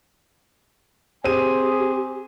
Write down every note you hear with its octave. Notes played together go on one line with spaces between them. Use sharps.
C4 G4 G#4 G#5 D#7